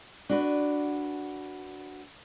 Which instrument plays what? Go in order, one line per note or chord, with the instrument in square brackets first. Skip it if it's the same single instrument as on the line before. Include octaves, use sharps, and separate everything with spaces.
[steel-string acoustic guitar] D4 F#4 B4